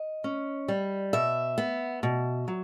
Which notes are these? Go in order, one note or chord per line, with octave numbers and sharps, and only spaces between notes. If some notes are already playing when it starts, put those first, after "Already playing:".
Already playing: D#5
C#4
G3
B2 E5
B3
B2
F#3